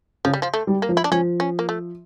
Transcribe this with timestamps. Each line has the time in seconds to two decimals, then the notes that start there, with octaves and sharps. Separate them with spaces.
0.25 C#3 F3
0.33 G3
0.42 F3
0.54 A3
0.67 G3
0.82 A#3
0.89 F3
0.97 E4
1.04 D4
1.11 F3 C#4
1.40 C#4
1.59 A#3
1.69 A3